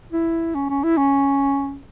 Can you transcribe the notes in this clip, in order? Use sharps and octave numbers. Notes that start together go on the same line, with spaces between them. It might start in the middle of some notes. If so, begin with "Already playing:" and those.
E4
C#4
C#4
E4
C#4